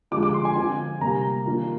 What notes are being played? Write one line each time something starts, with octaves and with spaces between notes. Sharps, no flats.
D3 F3 G#3 D6
D6
C6
G#5
D3 F3 C4 F4 G#5
C3 G3 A#3 A#5
D#3 A#3 D4 F4